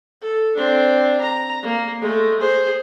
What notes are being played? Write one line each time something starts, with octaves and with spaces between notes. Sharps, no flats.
A4
C4 D4
A#5
A#3
G#3 A3
G#4 C5